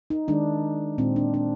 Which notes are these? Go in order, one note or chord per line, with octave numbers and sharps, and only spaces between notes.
D#4
D#3 G#3 D4
A#2 G#3 C4
D4
D4